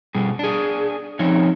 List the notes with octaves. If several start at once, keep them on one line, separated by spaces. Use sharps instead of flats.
B2 G3 G#4
D4 G#4
F3 C4 C#4 D#4 C#5